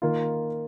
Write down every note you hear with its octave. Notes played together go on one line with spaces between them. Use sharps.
D#3 A#3 F4